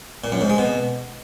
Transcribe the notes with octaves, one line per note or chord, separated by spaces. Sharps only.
A#2
F#2
G#2
G#3
B2